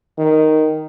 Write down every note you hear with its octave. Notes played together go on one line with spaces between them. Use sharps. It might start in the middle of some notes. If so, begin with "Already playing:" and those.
D#3